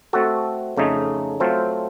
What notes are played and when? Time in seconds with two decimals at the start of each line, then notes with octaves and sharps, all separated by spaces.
0.13 A3 C4 F#4 A4
0.77 F2 C#3 A3 D#4
1.40 F#3 A3 C4 F4 C5